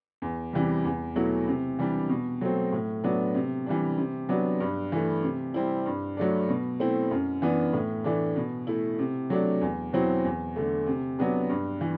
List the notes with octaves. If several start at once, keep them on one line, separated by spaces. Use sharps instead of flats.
E2
C3 E3 G3
E2
B2 F#3 A3 E4
C3
E3 G3 D4
B2
F#3 A3 C4
A2
F#3 B3 D4
C3
E3 G3 D4
C3
F#3 B3 D4
G2
E3 A3
C3
G3 C4 E4
G2
F#3 A3 D4
B2
A3 C4 E4
F#2
E3 B3 D4
A2
E3 A3 D4
B2
A3 E4
C3
F#3 A3 D4
E2
B2 F#3 C4 E4
E2
D3 A3
C3
F#3 B3 D4
G2
E3